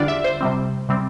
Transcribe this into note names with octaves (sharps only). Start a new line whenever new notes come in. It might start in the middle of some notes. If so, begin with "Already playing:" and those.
Already playing: E2 D3 G3 D4 F4 D5
E5
C5
C3 G3 C4
C3 G3 C4